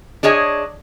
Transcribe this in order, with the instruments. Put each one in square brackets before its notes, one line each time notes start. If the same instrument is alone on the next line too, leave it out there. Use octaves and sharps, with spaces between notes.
[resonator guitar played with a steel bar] D4 G#4 C#5 D#5